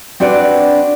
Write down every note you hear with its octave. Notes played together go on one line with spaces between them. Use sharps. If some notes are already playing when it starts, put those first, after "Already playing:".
C4 D4 F#4 B4 D5